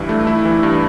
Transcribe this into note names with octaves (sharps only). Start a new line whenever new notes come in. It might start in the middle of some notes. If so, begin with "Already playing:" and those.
Already playing: G2 E3 E4
A3
E4
E3
G2